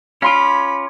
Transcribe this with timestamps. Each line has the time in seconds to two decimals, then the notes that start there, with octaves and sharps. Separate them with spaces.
0.22 C#4 F4 F5 B5 C6 D6